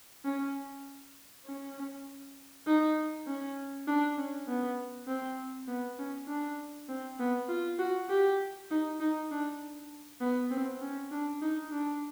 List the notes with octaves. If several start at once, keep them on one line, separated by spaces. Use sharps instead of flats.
C#4
C#4
D#4
C#4
D4
C#4
B3
C4
B3
C#4
D4
C4
B3
F4
F#4
G4
D#4
D#4
D4
B3
C4
C#4
D4
D#4
D4